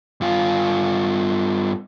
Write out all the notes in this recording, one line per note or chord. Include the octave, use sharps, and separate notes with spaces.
G2 F4